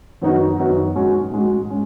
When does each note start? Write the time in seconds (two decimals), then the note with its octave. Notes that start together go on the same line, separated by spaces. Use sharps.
0.22 F#2 D#3 B3 D#4 F#4
0.58 F#2 D#3 B3 D#4 F#4
0.96 G#2 G#3 C#4 F#4
1.32 G#2 G#3 C#4 F#4
1.70 G#3 C#4